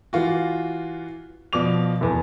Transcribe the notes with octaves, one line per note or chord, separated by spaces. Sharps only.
E3 F4 F#4
B2 F3 D5 D6 F7
F1 E2